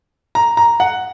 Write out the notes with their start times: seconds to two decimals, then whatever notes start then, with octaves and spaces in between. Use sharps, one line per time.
0.35 A#5
0.57 A#5
0.80 F#5